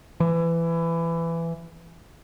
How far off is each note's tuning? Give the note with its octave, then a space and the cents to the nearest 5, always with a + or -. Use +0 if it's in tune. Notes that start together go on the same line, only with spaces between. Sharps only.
E3 +20